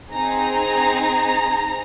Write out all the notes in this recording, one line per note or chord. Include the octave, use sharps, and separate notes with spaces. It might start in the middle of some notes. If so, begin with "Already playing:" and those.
C4 D#4 G#4 A#5